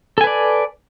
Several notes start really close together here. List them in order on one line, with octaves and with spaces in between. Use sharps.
A4 G#5 B4 D5